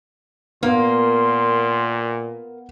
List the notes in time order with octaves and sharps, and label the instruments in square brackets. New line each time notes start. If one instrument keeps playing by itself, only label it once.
[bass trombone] A#2 [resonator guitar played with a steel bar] A#3 [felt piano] B3 [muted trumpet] C6